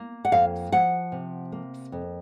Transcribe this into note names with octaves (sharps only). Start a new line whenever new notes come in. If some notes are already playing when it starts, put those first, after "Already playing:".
Already playing: A#3
F#5
F2 F5
F3 F#5
C3
A#3
F2